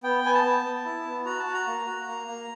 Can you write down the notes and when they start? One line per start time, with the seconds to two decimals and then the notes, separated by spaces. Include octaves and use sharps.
0.03 B3 G5
0.24 B3 G#5
0.34 A5
0.44 B3
0.65 B3
0.85 E4
1.05 B3
1.26 F#4 A#5
1.39 A5
1.46 F#4
1.54 A#5
1.67 A#3
1.87 F#4
2.08 A#3
2.27 A#3